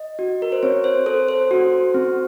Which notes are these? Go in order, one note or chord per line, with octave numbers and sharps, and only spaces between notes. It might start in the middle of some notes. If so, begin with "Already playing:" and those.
Already playing: D#5
F#4
A#4
C5
C4 C#5
C5
A4 C5
C5
F#4
C4